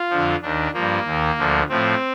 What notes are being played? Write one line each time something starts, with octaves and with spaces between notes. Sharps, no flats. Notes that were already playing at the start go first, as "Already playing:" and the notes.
Already playing: F4
F2 D3 F3
D#2 D#3 D4
G2 F3 A#3
D#2 D#3
D2 D3 F3
A2 F3 C4